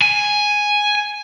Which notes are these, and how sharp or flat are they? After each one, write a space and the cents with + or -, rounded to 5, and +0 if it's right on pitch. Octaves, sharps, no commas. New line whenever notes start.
G#5 +0